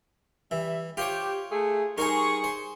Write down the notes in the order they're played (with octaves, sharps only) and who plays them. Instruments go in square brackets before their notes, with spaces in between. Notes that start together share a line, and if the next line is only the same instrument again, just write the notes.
[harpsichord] E3 [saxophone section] G3 G4 E5
[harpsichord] F4 C5 C#5 [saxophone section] G4
[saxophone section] A3 G#4
[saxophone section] G3 D#4 [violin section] G#4 C#6 [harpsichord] A#4 C5 G#5
[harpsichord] C5